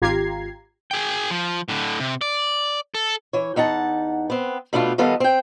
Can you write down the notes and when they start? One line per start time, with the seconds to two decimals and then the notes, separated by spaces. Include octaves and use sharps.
0.02 G#1 F4 G4 A#5 G#6 C7
0.91 G#4 G5
1.30 F3
1.68 A2 D3
2.00 C3
2.21 D5
2.95 A4
3.33 E3 C#5
3.56 E2 D#4 F#5 A5
4.30 B3 C4
4.73 B2 A3 B3 D4 D#4 F4
4.98 D#3 G3 B3 F4 A4 D#5
5.20 C4 G5